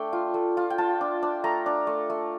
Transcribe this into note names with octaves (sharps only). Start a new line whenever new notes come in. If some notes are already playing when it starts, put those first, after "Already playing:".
Already playing: A3 D4 G5
F4
A3
F4
G5
F4 A5
D4
D4
A3 A#5
D4
A3
A3